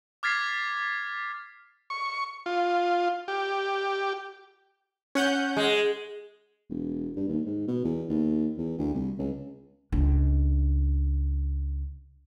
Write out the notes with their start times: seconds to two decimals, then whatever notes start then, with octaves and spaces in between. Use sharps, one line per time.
0.23 D6 F6 G#6 A6 B6 C7
1.90 C#6
2.46 F4
3.28 G4
5.15 C#4 F#5 G6
5.57 G#3
6.70 E1
7.16 G2
7.28 D#2
7.46 G#2
7.68 B2
7.84 E2
8.09 D#2
8.58 E2
8.78 D2
8.94 C2
9.19 C#2
9.92 C#2 D4